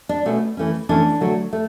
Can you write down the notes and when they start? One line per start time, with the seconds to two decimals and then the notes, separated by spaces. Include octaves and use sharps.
0.09 D4
0.25 B2 A3 C#4
0.57 E3 A3 C#4
0.89 E3 A3 C#4 D4
1.21 D3 F#3 A3
1.53 A3